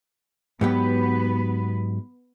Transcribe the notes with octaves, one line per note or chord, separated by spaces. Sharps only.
G#2 F#3 B3 G4 B4